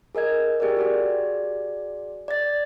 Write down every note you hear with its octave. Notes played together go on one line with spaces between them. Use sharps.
G#4 A#4 D#5 G#6
G4 G#4 A#4 D5
F#4 G#4 D5
D5 A6